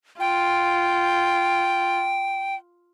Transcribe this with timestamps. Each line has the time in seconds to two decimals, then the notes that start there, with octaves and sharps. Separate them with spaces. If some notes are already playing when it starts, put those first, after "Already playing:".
0.20 F4 G5